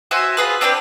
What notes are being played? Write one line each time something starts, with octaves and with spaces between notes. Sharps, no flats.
F#4 C5 E5 G#5
F4 G#4 B4
C4 D4 G4 B4